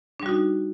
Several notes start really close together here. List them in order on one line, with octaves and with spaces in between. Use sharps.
D4 G3 F#4 D#4